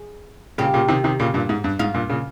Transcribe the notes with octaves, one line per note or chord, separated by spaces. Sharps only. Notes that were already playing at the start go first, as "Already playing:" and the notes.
Already playing: G#4
A#2 C#3 G4
A#2 C#3
C3 D#3
C3 D#3
A#2 C#3
G2 A#2
G#2
G2
G#2 F4
G2 A#2
A#2 C#3